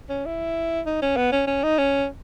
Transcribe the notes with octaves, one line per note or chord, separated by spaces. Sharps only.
C#4
E4
D#4
C#4
B3
C#4
C#4
D#4
C#4